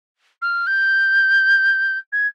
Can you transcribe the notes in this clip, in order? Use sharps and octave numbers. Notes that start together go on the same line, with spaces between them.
F6
G6
G#6